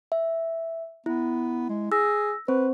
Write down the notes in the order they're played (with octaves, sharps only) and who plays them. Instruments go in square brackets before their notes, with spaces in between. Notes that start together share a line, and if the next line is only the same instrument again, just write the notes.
[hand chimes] E5
[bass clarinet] B3 [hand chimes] E4
[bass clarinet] G#3
[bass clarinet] G#4 [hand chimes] E6 A#6
[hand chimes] C4 C5 [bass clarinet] B4